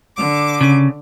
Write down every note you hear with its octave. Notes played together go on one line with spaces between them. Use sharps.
D3 D6
C#3